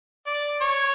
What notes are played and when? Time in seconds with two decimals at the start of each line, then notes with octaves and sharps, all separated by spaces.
0.27 D5
0.61 C#5